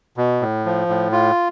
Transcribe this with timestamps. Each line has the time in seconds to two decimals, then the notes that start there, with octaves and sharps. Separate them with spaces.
0.17 B2
0.41 A2
0.65 F3
0.89 A2
1.12 F4